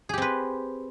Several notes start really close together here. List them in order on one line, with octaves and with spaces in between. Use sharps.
G#4 G4 C4 B4